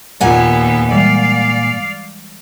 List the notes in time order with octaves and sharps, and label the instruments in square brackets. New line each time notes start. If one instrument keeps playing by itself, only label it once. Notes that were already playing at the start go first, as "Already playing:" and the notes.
[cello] D#2 B3 [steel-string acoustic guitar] A#2 F#5 G#5 [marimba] F4 D5
[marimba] E3 G3 G#3 [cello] D5 F5